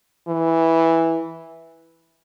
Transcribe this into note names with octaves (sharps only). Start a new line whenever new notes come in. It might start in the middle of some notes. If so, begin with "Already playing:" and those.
E3